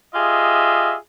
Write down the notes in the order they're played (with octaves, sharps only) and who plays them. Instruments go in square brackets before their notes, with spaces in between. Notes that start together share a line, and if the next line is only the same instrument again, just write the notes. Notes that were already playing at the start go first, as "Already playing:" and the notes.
[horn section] F4 G4 G#4 D#5 E5